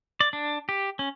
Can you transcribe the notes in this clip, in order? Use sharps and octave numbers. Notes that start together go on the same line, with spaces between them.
D5
D4
G4
C#4